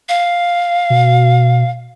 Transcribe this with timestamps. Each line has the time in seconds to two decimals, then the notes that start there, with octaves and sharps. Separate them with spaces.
0.09 F5
0.90 B2